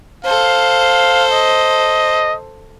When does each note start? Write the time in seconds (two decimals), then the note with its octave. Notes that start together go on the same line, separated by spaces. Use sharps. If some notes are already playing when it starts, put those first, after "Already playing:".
0.25 A4 C5 F5
1.32 D#5